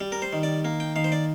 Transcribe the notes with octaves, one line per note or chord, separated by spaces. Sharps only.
G3
A#4
C5
D#3
D5
A#3
G5
D#3 F5
C5
D5